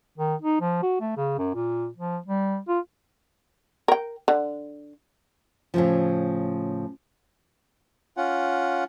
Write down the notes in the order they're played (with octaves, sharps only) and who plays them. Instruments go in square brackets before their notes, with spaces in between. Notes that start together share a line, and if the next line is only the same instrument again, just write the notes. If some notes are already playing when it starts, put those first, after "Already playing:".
[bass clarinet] D#3
D#4
F3
F#4
A3
C#3
F#2
A#2
F3
G3
F4
[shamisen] A#4 G5
D3
[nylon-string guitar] A2 C#3 F3
[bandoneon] C#4 F4 F#5